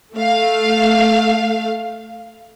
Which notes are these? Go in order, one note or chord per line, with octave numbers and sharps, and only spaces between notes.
A3 F5